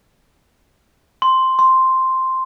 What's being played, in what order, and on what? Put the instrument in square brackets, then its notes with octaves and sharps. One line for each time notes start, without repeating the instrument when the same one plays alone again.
[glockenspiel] C6
C6